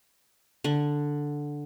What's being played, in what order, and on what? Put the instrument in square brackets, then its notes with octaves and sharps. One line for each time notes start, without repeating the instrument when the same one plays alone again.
[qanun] D3